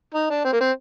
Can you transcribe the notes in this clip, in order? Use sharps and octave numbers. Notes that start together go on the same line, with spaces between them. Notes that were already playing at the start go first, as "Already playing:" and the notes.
D#4
D4
C4
A#3
C4